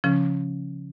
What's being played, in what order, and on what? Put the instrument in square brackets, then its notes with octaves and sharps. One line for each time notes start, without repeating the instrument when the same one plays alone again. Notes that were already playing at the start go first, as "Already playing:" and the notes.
[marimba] C#3 F3 C#4